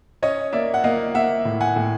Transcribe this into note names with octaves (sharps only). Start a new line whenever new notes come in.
C#4 C#5 D#5
A#3 D5 E5
F#5
A#3 D#5 F5
A#3 E5 F#5
A2
F#5 G#5
A2